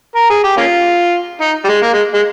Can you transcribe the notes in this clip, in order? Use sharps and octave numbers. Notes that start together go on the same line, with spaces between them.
A#4
G#4
G4
A#3 C#4 F4
D#4
G3
G#3
A#3
G#3
G#3